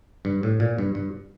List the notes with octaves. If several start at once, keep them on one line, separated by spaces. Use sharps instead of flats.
G2
A2
A#2
G2
G2